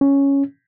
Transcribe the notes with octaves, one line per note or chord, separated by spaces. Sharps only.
C#4